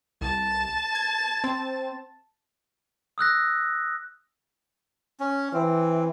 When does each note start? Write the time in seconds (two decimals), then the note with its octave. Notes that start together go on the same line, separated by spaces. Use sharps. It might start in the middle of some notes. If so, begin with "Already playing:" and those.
0.21 C2 A5
0.95 G#6
1.44 C4
3.18 D#6 E6 F#6 A#6
5.20 C#4
5.54 E3 C4